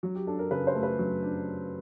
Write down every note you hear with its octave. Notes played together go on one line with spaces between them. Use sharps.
F#3
G4
D4 A4
A#4
C#3 B4
C5
A3
B4
F#3
D4